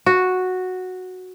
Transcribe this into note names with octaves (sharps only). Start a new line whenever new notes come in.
F#4